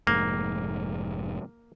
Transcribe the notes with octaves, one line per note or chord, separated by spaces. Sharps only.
F1 G#2 A#3